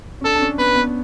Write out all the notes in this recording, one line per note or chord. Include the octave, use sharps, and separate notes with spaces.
C#4
D4 A4
D4
C#4
B3 B4
B3